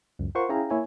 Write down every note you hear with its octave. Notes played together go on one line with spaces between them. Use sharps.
C#2 F#2
F4 A#4 C5 F#5 C6 C#6
C#4 E4 G#4 F5 G5 A#5
A#3 E4 C#5 G#5